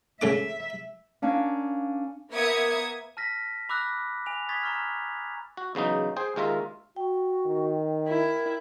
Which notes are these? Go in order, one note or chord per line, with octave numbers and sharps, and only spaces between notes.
C#3 A3 E5 D6
A#3 C#4 D4
A#3 B3 E5 D#6 G#6 C#7
A5 F6 A#6 B6
B5 D6 E6 F#6 A#6
G#5 F7
C#6 D#6 G#6 A6 B6
A#5 C#6 F6
F#4
E2 C#3 F#3 D#4
G#4 C5 G5
D#2 G#3 F4 A#4 E5
F#4 G5
D#3
E4 A#4